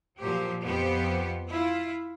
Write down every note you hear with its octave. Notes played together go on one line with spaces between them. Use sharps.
A#2 F3 F#3 G4 C5
F2 F3 B3 G4 C5
E4 F4